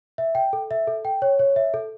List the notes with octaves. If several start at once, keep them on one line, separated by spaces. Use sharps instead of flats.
E5
G5
A4
E5
A4
G5
C#5
C#5
E5
A4